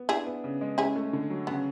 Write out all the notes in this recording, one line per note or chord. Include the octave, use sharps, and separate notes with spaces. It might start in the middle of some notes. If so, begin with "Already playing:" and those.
Already playing: B3
D4 E4 G#4
B3
C#3
G#3
C#4 E4 G#4
A3
D3
F#3
C#3 B3